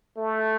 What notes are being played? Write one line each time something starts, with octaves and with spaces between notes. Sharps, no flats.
A3